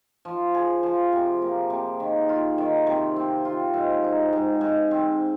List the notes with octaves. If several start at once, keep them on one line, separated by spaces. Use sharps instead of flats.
F3
G#4
F3
C3
A#3
C3
D#3
F4
D#3
C3
C4
F4
G#2
D#4
G#2
G#2
C4